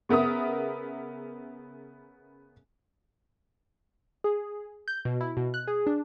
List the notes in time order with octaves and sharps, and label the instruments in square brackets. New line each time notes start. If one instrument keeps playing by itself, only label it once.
[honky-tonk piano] C#3 B3 A#4 E5 D#6
[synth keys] G#4
G6
B2
E4
B2
F#6
G#4
D4